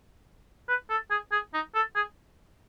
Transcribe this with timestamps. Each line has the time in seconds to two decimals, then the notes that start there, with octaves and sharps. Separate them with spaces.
0.69 B4
0.90 A4
1.11 G#4
1.32 G#4
1.54 D#4
1.75 A4
1.95 G#4